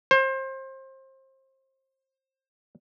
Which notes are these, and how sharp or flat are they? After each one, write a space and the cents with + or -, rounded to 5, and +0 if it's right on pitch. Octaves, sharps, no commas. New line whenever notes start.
C5 +25